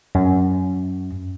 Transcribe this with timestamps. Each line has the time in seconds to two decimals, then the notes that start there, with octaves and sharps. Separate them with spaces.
0.15 F#2